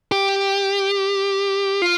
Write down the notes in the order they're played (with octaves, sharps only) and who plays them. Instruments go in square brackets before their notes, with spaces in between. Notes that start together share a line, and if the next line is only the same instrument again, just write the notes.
[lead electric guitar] G4
F4